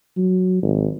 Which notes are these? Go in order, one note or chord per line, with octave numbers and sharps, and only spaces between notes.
F#3
G#1